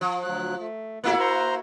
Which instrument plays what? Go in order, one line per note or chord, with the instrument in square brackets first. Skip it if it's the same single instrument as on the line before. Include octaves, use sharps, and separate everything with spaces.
[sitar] F3
[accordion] D2 F#3 F#6
A3
[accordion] E2 A#2 A3 [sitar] A#3 E4 F#4
[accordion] C5 A#5 C6